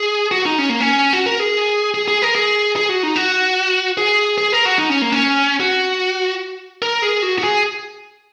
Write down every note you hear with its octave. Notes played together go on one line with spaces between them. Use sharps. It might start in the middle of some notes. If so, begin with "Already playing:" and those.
Already playing: G#4
F#4
D#4
C#4
A#3
C#4
F#4
A#4
G#4
G#4
G#4
A#4
G#4
G#4
F#4
D#4
F#4
G#4
G#4
A#4
F#4
D#4
C#4
A#3
C#4
F#4
A#4
G#4
F#4
F#4
G#4